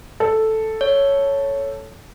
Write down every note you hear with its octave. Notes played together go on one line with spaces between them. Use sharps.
A4
C#5